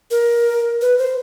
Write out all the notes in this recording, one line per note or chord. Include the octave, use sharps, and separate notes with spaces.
A#4
B4
C5